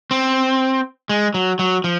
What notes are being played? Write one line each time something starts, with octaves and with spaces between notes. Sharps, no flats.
C4
G#3
F#3
F#3
F3